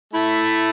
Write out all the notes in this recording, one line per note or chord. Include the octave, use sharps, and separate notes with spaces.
A3 E4